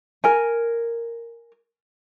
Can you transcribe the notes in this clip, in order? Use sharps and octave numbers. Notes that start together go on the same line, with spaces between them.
A#4 G#5